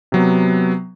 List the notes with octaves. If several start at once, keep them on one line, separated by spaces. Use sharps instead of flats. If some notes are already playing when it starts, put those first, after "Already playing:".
C3 F#3 B3